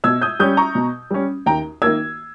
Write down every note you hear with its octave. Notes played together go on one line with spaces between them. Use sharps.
B2 E6 G#6
D#6 G6
G3 C#4 D#6 G6
A#5 C#6
B2
G3 C#4
D#2 G5 A#5
D#3 A#3 E6 G#6